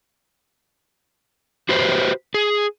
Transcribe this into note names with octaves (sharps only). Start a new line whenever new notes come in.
F#4 G4 B4 C5
G#4